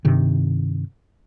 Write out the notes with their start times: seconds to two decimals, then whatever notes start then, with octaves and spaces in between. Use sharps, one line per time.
0.05 G2 C3 D#3